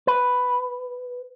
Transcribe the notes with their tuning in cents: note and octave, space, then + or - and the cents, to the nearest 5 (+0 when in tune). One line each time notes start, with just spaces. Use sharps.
B4 +5